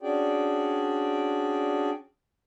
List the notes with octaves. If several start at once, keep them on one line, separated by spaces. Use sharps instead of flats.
C#4 D4 F#4 G#4 D5 G5